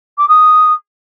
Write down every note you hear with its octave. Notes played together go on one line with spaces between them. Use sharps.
D6
D#6